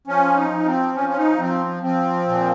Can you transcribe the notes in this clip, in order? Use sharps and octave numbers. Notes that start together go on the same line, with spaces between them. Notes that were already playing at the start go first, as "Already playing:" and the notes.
F3 C#4
D#4
F3
C4
F3 C#4
C#4
D#4
F3 C4
F3 C4
A#2